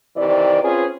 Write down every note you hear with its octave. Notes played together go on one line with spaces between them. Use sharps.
C3 D#3 E3 D5
C4 C#4 F4 G#4 B4 C5